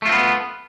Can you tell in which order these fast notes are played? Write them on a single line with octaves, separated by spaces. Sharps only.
A3 F4 C4 B3